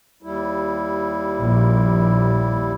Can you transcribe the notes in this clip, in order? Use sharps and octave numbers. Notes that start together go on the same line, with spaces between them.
D#2 G3 E4
A#1